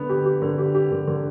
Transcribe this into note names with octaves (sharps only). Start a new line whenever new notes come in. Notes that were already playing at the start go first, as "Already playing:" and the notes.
Already playing: D3 B3
G4
G4
D3
G4
G4
D3
D3